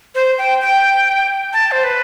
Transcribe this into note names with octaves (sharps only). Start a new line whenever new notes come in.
C5
G5
G5
A5
C5
B4